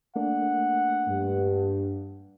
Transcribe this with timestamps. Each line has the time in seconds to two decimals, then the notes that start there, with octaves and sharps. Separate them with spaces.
0.16 A3 A#3 D4 F#5
1.09 G2